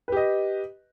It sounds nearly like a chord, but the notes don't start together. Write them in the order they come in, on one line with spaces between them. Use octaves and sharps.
B4 G4 D#5